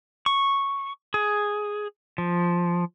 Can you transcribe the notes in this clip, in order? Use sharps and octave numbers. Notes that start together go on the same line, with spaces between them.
C#6
G#4
F3